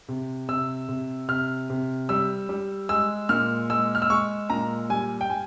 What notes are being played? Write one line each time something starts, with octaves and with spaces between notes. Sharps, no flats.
C3
C3 E6
C3
C3 F6
C3
G3 E6
G3
G#3 E6
A#2 F6
G#3 E6
F6
E6
G#3 C#6
A#2 A#5
G3 G#5
G5
G3 G#5